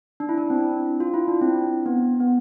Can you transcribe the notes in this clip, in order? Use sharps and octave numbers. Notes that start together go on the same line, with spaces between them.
D4
E4
D4
C4
F4
E4
D4
C4
B3
B3